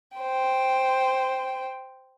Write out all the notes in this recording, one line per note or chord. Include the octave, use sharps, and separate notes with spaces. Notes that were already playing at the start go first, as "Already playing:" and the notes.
C5 G5